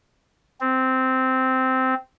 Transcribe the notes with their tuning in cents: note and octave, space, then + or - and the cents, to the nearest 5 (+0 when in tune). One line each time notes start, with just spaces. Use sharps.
C4 -10